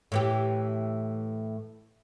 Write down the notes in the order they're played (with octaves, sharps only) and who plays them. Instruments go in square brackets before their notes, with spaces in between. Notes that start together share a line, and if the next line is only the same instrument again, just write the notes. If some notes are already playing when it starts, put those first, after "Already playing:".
[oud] A2 E3 G4